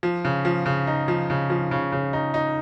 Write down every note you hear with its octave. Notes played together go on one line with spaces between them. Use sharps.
F3
C#3
F3
C#3
D#4
F3
C#3
F3
C#3
C#3
D#4
D#4